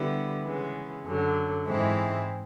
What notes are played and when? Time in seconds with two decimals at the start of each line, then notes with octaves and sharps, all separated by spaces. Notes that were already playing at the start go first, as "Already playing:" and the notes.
Already playing: D3 G3 B3 E4
0.43 C#3 E3 G#3 B3
1.05 F#2 D3 F#3
1.66 G#2 E3 G#3 C4 E4